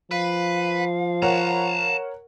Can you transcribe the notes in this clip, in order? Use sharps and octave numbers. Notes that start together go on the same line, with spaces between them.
F3 B4 F5
A#4 C#5 F#5 A5 A#5